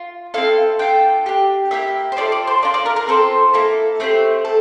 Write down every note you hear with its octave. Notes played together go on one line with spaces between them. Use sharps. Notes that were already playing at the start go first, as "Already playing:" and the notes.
Already playing: F4
C4 E4 A4 F5
D4 F4 A4 G5
D4 G4
A#3 E4 G4 E5
C5
C4 F4 A4 D5
D5
C5
A#3 D4 F4 D5
D5
A#4
A#4
C4 F4 A4 C5
A#3 E4 A4
A3 C4 G4 C5
A4